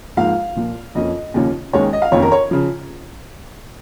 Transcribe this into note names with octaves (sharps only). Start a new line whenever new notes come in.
G#2 F3 A#3 F5
A#2 F3 A#3
F2 F3 A#3 C#4 D#5
D#2 C#3 F3 A#3 C#4
D#2 D#3 G#3 C#4 C#5
D#5
F5
F2 D#3 A#3 C#4 C#5
A#4
C#5
C#3 F3